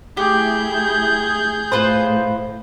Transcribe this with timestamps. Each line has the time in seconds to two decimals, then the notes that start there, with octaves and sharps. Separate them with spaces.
0.17 A3 E4 G4 G#4 G6
1.72 A2 F4 B4 C5